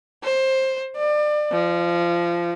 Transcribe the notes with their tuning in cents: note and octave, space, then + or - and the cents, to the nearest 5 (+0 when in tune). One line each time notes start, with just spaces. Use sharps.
C5 +15
D5 +30
F3 -20